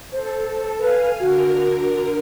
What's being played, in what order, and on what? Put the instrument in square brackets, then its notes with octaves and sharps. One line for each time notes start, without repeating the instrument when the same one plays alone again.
[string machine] A4 [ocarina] C5
[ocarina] B4 [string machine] F5 G#5
[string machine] D3 A#4 [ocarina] F#4